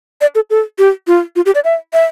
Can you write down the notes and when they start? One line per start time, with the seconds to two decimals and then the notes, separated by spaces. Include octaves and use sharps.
0.21 D5
0.35 A4
0.50 A4
0.79 G4
1.07 F4
1.36 F4
1.46 G4
1.55 D5
1.64 E5
1.93 E5